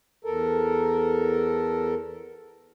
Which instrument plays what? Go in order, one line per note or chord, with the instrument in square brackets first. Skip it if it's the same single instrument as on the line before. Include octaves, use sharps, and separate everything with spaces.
[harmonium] E2 A4 A#4